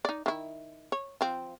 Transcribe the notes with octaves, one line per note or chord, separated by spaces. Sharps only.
D#4 D5
D#3 E4
C#5
F3 C4